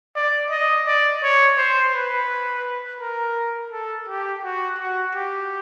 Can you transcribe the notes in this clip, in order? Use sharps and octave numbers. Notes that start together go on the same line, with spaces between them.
D5
D#5
D5
C#5
C5
B4
A#4
A4
G4
F#4
F#4
G4